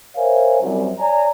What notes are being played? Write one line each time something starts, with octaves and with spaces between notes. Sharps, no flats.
A#4 C5 C#5 E5 F5 G#5
C2 F#2
C#5 D5 G#5 A#5